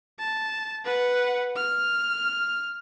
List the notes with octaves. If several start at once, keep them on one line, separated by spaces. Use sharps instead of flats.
A5
B4 F#5
F6